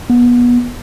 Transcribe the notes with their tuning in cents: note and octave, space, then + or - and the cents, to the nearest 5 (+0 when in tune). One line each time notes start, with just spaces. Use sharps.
B3 -25